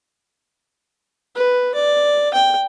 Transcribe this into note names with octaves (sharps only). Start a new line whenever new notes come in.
B4
D5
G5